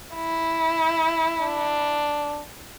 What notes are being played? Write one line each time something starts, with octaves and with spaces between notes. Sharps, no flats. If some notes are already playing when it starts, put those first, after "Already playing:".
E4
D4